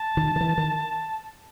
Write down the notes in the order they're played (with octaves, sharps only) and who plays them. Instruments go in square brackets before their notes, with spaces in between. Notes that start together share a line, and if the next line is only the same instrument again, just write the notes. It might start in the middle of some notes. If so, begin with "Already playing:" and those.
Already playing: [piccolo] A5
[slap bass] D#3
D#3
E3
D#3